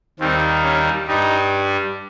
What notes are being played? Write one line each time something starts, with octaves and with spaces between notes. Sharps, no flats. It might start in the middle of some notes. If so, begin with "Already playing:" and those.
D#2 D#3 G3 C4
C#4
G2 G3 D#4